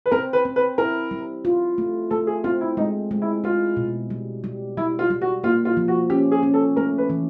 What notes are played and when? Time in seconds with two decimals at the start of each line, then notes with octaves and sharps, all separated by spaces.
0.06 B4
0.11 C4 A#4
0.33 B4
0.45 C4
0.56 B4
0.78 E4 A#4
1.11 G3
1.45 F4
1.78 A3
2.10 A3 A4
2.27 G#4
2.44 C4 F4
2.61 E4
2.77 G#3 D#4
3.11 G#3
3.22 E4
3.44 E4 F4
3.77 B2
4.10 G3
4.44 G3
4.77 G3 E4
4.99 F4
5.10 G3
5.21 F#4
5.44 A#3 F4
5.65 F4
5.77 F3
5.88 F#4
6.10 C#4 G4
6.31 G#4
6.43 C#4
6.54 A4
6.76 A3 A#4
6.98 B4
7.10 E3